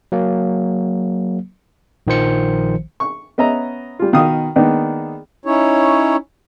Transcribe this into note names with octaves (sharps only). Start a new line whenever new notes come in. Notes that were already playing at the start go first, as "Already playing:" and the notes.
F#3 A#3
A#1 D#3 F3 C5 C#7
C#6
B3 C#4 D#5 E5 A#5
G3 F4
B2 D#3 F5 D#6
D#3 G#3 A#3 B3 D4 D#4
C#4 D#4 E4 C#5